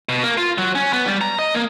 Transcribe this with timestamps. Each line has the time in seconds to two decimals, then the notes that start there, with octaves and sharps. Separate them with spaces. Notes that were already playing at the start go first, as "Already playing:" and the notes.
0.09 B2
0.23 A#3
0.37 F4
0.58 F#3
0.75 C#4
0.93 B3
1.06 G3
1.21 A#5
1.39 D#5
1.55 A#3